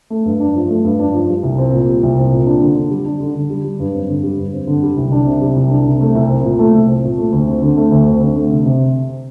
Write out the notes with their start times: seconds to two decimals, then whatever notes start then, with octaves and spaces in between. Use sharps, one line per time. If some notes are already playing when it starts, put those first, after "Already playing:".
0.10 A3
0.25 G2
0.40 D4
0.55 F3
0.69 A3
0.85 G2
0.99 D4
1.14 F3
1.29 G3
1.43 C2
1.58 C4
1.73 A#2
1.88 G3
2.03 C2
2.17 C4
2.32 A#2
2.46 D4
2.61 D3
2.76 D3
2.90 G3
3.06 D4
3.20 D3
3.35 D3
3.50 G3
3.64 G3
3.80 G2
3.94 C4
4.09 D3
4.23 G3
4.38 G2
4.53 C4
4.67 D3
4.83 G3
4.97 C2
5.12 D4
5.27 C3
5.42 G3
5.56 C2
5.71 D4
5.86 C3
6.01 A3
6.15 C2
6.29 C4
6.44 A#2
6.59 A3
6.74 C2
6.88 C4
7.04 A#2
7.18 A3
7.32 D2
7.47 C4
7.62 D3
7.77 A3
7.92 D2
8.07 C4
8.21 D3
8.36 A3
8.51 C3
8.66 C3